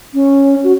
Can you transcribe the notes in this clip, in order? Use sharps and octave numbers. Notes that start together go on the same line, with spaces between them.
C#4
F#4